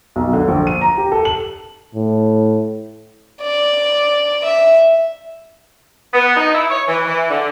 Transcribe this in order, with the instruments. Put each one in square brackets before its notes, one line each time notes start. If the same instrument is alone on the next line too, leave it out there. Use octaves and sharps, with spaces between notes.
[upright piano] B1
D3
A#1
D#7
A#5
G4
A4
F#7
[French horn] A2
[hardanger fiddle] D5
E5
[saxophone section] B3
D#4
E4
C#5
E3
E3
D3